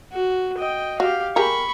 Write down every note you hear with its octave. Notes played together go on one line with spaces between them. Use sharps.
F#4
D#5 G5
F#4 G4 F5
G4 G#4 A#4 B5 C#6